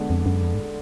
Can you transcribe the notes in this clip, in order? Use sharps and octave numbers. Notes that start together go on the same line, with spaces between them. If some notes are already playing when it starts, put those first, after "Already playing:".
Already playing: D3 G#3 B3 D4
F2
F#2
F2
G#2